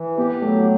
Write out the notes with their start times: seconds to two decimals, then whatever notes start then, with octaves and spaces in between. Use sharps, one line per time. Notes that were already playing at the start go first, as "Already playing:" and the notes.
Already playing: E3
0.17 B3 G4
0.42 F#3 A3